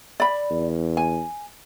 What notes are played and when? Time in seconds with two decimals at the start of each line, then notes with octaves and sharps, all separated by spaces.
0.20 D5 B5
0.50 E2
0.97 G#5